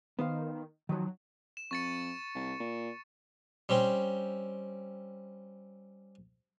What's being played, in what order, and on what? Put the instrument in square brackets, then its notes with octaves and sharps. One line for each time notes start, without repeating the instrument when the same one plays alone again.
[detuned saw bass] D#3 [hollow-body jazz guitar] B3 C5 F5
[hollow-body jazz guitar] D#3 F3 [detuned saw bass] F#3
[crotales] E7
[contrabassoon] F2 [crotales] C#6 A6 C#7
[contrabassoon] C2
A#2
[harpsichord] G3 C4 C#4 C5 G5